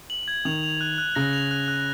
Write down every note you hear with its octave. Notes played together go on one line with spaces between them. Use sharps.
F#7
G#6
D#3 F7
F7
F#6
F#6
C#3 A#6
F7
F#6
F#6